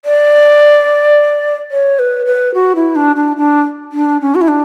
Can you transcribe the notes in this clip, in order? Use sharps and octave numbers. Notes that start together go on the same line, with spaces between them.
D5
C#5
B4
B4
F#4
E4
D4
D4
D4
D4
C#4
F#4
E4
D4